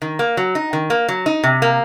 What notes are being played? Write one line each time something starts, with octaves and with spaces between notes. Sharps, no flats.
D#3
A#3
F#3
D#4
D#3
A#3
F#3
D#4
C3
A#3